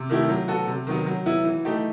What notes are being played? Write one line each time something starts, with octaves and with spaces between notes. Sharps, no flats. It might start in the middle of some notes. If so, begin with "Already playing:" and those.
Already playing: C3
D#3 A3 E4 G4
F#3
B3 F#4 A4
C3
D#3 F#3 B3
F#3
B3 E4
E3
A3 D#4 G4